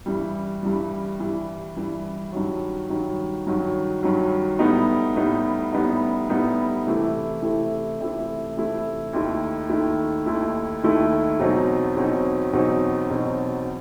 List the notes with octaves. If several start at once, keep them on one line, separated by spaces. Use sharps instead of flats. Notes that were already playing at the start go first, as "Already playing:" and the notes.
G2 E3 G3
G2 E3 G3
G2 E3 G3
G2 E3 G3
G2 D#3 F#3
G2 D#3 F#3
G2 D#3 F#3
G2 D#3 F#3
A2 G3 B3 D#4
A2 G3 B3 D#4
A2 G3 B3 D#4
A2 G3 B3 D#4
C3 E3 A3 E4
C3 E3 A3 E4
C3 E3 A3 E4
C3 E3 A3 E4
D#2 D#3 A3 E4
D#2 D#3 A3 E4
D#2 D#3 A3 E4
D#2 D#3 A3 E4
E2 B2 F#3 C4 D#4
E2 B2 F#3 C4 D#4
E2 B2 F#3 C4 D#4
E2 B2 F#3 C4 D#4